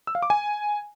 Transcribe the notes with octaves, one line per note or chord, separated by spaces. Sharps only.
E6
F5
D6
G#5